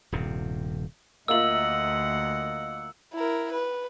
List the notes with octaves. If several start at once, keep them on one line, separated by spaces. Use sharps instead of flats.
D#1 G2 C3
D2 A#3 F4 D#5 E5 F#5 E6 F#7
E4 A#4
B4